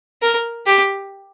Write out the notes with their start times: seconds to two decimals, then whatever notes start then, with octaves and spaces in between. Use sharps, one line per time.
0.22 A#4
0.66 G4